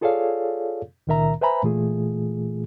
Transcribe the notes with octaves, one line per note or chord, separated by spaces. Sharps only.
F4 G#4 A4 C#5 D5 F5
C#2 A#2 D#3 A#4 E5 A#5
B4 C5 E5 G#5 A#5 B5
A#2 E3 A3 F4 G#4